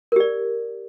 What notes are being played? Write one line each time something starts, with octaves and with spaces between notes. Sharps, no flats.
G4 A#4 D5